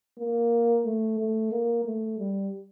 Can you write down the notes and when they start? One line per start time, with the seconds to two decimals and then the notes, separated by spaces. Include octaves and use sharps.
0.19 A#3
0.86 A3
1.19 A3
1.51 A#3
1.85 A3
2.19 G3